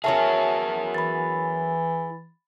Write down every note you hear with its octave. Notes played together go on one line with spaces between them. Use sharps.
F#3 C#4 E4 G#4 A#4 E5 A5
E3 B5 A6